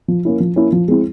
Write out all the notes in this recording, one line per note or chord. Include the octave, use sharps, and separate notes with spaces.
F3
A#3 C#4 E4
F3
A#3 C#4 E4
F3
G#3 C4 E4